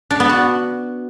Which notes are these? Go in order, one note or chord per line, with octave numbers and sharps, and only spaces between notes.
D4
B3
F#4